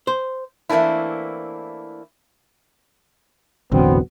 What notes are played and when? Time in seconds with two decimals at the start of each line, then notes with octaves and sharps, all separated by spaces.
0.07 C5
0.69 E3 A3 A#3 C4 D4 E4
3.72 E1 A1 D3 F#3 B3 C4